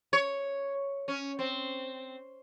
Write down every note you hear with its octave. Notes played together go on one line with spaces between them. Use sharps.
C#5
C#4
C4